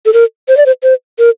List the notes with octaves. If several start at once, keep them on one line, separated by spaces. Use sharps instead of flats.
A4
A#4
C5
D5
C5
C5
A#4